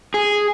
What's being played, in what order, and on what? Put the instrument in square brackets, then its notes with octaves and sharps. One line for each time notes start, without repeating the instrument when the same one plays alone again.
[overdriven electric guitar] G#4